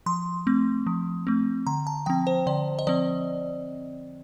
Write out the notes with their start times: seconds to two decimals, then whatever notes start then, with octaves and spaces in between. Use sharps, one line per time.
0.06 F3 C6
0.47 A3 C4
0.87 F3
1.27 A3 C4
1.67 D3 A#5
1.87 A5
2.06 F3 C4 G5
2.27 C5
2.47 D3 D5
2.79 D#5
2.87 F3 C4 D5